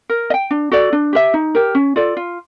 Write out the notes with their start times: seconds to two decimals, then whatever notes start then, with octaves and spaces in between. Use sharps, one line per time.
0.09 A#4
0.30 D#5
0.34 G5
0.51 D4
0.71 F#4 A4 D5
0.93 D4
1.13 G4 B4 E5
1.34 D#4
1.55 G4 A#4
1.75 C#4
1.96 F4 A4 D5
2.17 F4